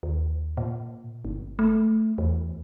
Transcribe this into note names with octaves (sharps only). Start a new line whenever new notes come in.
D#2
A#2
G1
A3
E2